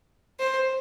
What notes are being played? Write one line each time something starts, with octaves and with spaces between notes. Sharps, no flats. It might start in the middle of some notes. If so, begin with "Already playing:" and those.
C5